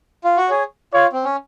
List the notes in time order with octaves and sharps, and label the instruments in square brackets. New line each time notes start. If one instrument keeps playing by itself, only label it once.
[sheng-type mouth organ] F4
F#4
[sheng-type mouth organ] G#4 [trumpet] C#5
[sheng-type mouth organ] F4 [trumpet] C#5
[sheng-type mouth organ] C4
C#4